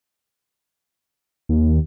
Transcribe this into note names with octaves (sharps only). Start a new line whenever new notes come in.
D#2